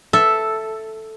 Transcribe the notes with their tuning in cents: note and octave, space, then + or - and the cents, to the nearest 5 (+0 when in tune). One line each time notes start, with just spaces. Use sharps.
A4 +0 E5 +0